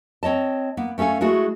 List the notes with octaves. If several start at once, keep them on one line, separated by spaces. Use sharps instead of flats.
C4 C#5 D#5 A5
A#3 B3
A3 C#4 A4 F5 G#5
G#3 A3 E4 F#4 G#4